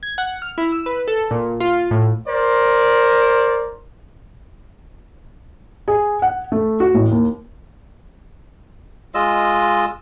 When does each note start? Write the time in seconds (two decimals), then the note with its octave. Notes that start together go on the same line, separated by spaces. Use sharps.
0.03 G#6
0.18 F#5
0.42 F6
0.58 E4
0.72 E6
0.86 B4
1.08 A4
1.31 A#2
1.60 F4
1.91 A2
2.28 A#4 C5 D5
5.88 G#4
6.22 F#5
6.52 A3
6.80 F#4
6.94 A1
7.11 D#2
9.14 G#3 F4 D#5 E6